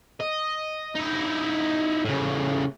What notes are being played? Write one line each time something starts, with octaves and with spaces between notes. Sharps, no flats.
D#5
D#4 E4
A2 C#3